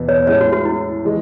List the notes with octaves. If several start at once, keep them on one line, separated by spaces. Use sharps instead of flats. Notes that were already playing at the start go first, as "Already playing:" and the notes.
Already playing: E2 B2 B3 E4
C#5
A2 G#3 C#4 C#5
F#4
F#4
E4
E3 G#3